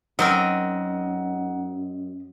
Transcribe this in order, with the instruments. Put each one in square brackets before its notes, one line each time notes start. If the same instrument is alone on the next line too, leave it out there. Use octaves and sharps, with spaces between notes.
[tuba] F#2 [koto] F#3 C4 A#4 [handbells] D#4 F#5 [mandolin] D#5